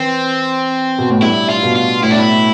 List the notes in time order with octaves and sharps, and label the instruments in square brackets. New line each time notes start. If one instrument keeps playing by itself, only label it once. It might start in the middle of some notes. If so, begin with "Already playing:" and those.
Already playing: [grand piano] E3 [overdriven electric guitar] C4
[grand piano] B2
A2
[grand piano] G2 [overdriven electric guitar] E4
[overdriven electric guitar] F4
[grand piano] B2
[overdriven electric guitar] F4
[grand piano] A2 [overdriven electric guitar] E4
[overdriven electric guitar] D4
E4